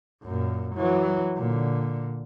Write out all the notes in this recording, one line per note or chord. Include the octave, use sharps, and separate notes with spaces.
F#2 A#2
E3 F#3
A#2 D3